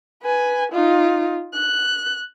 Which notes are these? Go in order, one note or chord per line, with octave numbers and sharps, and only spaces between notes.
B4 G#5
D#4 F4
F#6